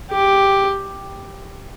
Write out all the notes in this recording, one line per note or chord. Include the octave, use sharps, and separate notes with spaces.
G4